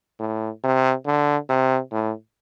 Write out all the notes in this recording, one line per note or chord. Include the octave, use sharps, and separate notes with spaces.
A2
C3
D3
C3
A2